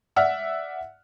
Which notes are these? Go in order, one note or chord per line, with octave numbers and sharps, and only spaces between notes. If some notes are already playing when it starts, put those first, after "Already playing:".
D5 E5 F#5 E6 F6